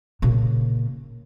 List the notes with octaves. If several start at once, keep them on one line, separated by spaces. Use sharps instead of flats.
A#2 C#3